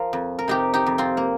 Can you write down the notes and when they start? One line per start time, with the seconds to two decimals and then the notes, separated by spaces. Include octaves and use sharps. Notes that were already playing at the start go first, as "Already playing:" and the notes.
Already playing: F3 F4 A#4
0.13 F2
0.39 A#4
0.48 C3 D#4 G4
0.74 D#4 G4
0.86 F2
0.98 C4 F4
1.17 A#3